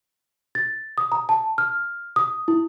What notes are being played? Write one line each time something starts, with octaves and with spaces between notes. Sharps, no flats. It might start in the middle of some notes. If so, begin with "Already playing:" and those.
A6
D#6
A#5
A5
F6
D#6
E4